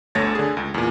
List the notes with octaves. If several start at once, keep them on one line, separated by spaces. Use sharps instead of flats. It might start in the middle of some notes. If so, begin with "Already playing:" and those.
G1 D2 A3 C#5 A6 A#6
D3 G#4
C#2
E2 A#2